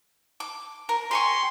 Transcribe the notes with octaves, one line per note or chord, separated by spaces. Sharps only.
D6
A#4
G4 G#5 C6 C#6